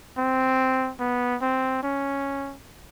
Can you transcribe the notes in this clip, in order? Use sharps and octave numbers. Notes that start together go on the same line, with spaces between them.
C4
B3
C4
C#4